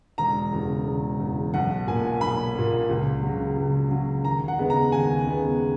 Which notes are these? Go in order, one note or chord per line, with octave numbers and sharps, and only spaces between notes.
E1 A#5
E2 C#3
E1
E2 C#3
B1 F#5
A#2 A#3 G#5
B1 B5
A#2 A#3
C#2
C#3 F#3
C#2
C#3 F#3
D#2 A#5
F#5
C#3 G#3 B3
A#5
D#2 G#5
C#3 G#3 B3